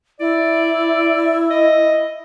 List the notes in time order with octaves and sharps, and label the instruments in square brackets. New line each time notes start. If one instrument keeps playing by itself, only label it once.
[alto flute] E4 [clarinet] D5
[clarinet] D#5